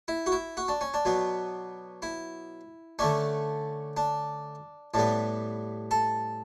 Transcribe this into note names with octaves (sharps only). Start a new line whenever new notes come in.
E4
F#4
E4
F#4
D4
C#4
D4
B2 F#3 B3
E4
D3 A3 C#4 D4
D4
A2 G3 B3 D4
A4